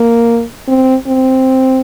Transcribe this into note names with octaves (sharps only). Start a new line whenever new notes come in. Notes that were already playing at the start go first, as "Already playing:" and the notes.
Already playing: A#3
C4
C4